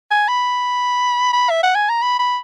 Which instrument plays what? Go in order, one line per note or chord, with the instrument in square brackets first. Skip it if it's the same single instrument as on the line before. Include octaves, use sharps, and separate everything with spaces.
[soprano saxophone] G#5
B5
B5
E5
F#5
G#5
A#5
B5
B5